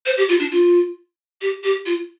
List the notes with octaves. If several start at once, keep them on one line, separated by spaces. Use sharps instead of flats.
C5
G4
F4
D4
F4
G4
G4
F4